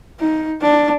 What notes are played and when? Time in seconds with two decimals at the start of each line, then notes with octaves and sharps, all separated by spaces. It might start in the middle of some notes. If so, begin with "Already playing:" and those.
0.20 D#4
0.61 D4